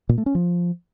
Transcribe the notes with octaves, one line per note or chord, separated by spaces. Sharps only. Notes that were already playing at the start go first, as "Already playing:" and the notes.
A#2
A3
C#4
F3